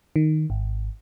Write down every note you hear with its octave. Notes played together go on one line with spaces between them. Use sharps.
D#3
G#1